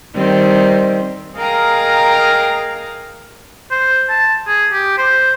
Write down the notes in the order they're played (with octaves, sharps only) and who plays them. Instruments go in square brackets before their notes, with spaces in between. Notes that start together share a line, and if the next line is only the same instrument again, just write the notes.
[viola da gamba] D#3 G3 C4
[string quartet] G#4 A#4 D#5 F5 G5 A#5
[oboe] C5
A5
G#4
G4
C5